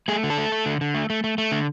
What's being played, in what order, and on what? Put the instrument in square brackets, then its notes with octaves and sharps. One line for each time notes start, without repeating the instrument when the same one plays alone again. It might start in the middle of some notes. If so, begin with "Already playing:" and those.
[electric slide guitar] A3 G#4
D3
A4
A3
A3
D3
D3
A3
A3
A3
A3
D3